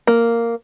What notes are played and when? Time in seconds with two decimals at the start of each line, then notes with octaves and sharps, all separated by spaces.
0.07 A#3